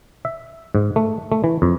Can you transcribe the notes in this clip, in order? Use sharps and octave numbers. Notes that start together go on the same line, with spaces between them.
E5
G#2
A3
A3
E3
F2